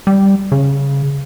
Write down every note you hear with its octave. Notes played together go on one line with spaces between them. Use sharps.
G3
C#3